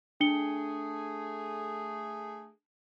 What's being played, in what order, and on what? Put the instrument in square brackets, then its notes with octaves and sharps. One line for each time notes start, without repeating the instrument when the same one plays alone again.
[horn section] A3 G#4 [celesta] D4 C#7 G7